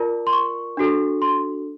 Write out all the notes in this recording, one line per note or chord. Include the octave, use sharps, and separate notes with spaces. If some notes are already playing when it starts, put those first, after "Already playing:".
Already playing: F4 A#4 D5 A5
C6
C#6
D4 F#4 A4
C6